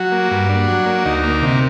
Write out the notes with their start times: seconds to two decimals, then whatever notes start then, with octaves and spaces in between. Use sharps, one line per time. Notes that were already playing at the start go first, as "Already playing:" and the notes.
Already playing: F#3 F#4
0.12 A#3
0.31 G2
0.49 D4
0.68 F#3
0.86 A#3
1.05 D2 D#4
1.23 A#3
1.43 C3